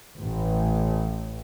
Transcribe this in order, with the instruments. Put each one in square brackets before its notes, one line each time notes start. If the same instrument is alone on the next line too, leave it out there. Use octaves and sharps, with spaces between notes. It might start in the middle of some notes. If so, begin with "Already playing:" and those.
[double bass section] A1